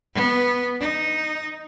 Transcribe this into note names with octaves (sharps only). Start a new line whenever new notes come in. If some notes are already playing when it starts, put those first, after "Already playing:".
B3
D#4